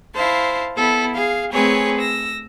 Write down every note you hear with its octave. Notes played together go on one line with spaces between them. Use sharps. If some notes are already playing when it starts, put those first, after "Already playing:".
E4 C5 F5 A5
B3 E4 A4
G#4 F5
A3 C4 G#4 B4 C#5 G#5
E6 A#6